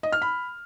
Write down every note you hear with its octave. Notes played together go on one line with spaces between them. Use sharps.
D#5
F6
B5